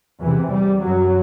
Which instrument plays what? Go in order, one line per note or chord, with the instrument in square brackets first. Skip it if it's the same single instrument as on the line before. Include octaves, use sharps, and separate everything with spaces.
[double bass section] E2 C3 E3
G3
F#2 F#3